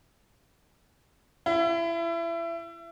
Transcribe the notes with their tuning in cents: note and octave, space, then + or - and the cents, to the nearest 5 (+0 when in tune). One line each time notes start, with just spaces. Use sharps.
E4 +30